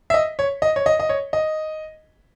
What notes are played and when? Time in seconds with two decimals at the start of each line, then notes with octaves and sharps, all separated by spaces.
0.10 E5
0.14 D#5
0.39 C#5
0.62 D#5
0.76 C#5
0.86 D#5
1.00 D#5
1.09 C#5
1.33 D#5